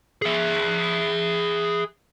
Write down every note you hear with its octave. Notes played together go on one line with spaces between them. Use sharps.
G#4 E5